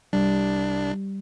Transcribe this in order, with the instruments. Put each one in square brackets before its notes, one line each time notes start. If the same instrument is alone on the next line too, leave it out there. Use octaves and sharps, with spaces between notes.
[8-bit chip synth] C2 D4 [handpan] G3